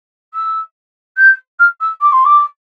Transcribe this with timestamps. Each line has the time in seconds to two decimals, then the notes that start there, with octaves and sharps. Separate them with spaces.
0.34 E6
1.17 G6
1.59 F6
1.80 E6
2.01 D6
2.12 C6
2.25 D6